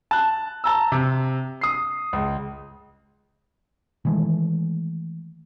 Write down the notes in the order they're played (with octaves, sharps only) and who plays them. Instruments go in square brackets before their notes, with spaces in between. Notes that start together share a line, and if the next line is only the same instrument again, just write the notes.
[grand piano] A5 F#6
A5 A#5 E6
C3
D#6 C7
C#2
[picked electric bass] D#3 E3 G#3 A3